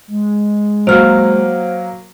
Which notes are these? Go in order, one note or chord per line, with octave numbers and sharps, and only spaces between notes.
G#3
F#3 A#3 C5 F6